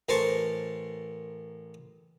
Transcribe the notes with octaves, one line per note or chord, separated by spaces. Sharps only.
A1 A#4 C5 A5 C#6